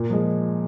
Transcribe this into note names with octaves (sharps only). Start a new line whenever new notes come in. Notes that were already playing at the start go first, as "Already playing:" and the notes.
Already playing: A#2
F3 G#3